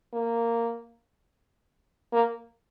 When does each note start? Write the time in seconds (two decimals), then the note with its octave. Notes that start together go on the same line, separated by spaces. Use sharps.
0.13 A#3
2.13 A#3